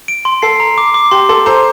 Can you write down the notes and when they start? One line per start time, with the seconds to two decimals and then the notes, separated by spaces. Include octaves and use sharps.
0.08 D7
0.25 C6
0.42 A4 C7
0.60 A#5
0.78 D6
0.94 D6
1.11 G4 C6
1.29 A4 C6
1.46 A4 C5 A#5